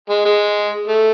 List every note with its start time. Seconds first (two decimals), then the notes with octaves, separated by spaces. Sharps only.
0.10 G#3
0.25 G#3
0.88 A3